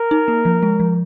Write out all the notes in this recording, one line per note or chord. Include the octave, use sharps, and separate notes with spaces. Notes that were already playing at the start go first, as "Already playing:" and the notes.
Already playing: A#4
D#4
A#3
F3
G#3
F3